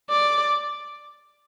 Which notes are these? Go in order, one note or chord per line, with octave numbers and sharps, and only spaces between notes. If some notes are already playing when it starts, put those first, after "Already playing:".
D5